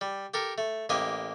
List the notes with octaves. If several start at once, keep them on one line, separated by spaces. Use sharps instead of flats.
G3
G4 A4 A#4
A3
A1 A#3 G4 D#5 G#5